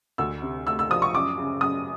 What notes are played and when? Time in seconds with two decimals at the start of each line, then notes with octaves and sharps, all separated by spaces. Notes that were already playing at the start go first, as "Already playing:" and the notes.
0.18 D2 E6
0.42 C3
0.67 A3 E6
0.79 E6
0.90 F3 D#6
1.02 C#6
1.15 F#2 D6
1.37 C#3
1.61 F#2 D#6